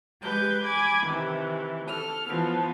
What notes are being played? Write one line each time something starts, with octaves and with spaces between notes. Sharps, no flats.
G#3 G4 B4 G6
G#5 B5 D6 G#6
C3 D#3 E3
A4 F6
E3 F3 B3